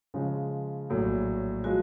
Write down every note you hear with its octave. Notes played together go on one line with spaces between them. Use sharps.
C#3 F3 G#3
A#1 A2 F#3
F3 G#3 F#4